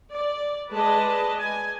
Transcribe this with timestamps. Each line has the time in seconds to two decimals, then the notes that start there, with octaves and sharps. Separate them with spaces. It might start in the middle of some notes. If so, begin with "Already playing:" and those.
0.12 D5
0.72 G#3 B4 D5 D#5 A5
1.40 G#5